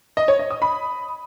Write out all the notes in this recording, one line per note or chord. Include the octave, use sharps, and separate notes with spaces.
D#5
C#5
D#5
D#6
B5